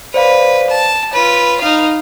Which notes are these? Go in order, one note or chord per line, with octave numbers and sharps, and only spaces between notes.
B4 C5 D5 F5
A5
F4 B4 C#5
D#4 F5